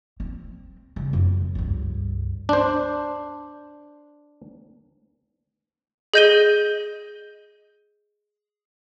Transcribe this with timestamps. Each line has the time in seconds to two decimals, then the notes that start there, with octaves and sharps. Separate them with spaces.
0.20 C4
0.96 C#3 G3
1.13 F#2
1.55 C#2 G2
2.49 D4 C5
6.14 G#4 D#5 G6 A#6 D#7 G7